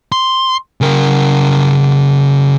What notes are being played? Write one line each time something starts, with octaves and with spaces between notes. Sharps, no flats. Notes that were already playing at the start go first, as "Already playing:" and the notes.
C6
C#3 A#4